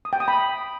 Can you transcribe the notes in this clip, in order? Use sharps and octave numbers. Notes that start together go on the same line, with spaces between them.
D#6
G5
D#6
B5